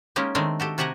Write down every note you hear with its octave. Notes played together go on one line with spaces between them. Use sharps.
G#3 A#3 C#4 D#4 G4
D#3 G#3 A3 C4 D4 A#4
F#4 G4 A4
C3 F#4 G4 F#5 G#5 A#5